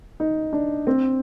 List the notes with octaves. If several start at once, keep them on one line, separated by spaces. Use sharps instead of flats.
D#4
D4
C4